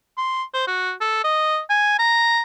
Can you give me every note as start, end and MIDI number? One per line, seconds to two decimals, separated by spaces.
0.18 0.43 84
0.54 0.66 72
0.67 0.93 66
1.01 1.22 69
1.24 1.60 75
1.70 1.99 80
1.99 2.42 82